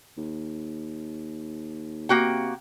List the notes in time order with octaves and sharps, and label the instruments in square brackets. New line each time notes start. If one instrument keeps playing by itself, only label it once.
[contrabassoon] D#2
[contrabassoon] C3 [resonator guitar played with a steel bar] A#3 F#4 G5